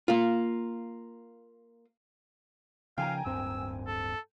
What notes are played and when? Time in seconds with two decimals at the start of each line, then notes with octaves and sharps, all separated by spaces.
0.08 A#3 F4
2.98 C#3 F3 F5 G5 G#5 A#5
3.25 D1 G2 C4 E6
3.87 A4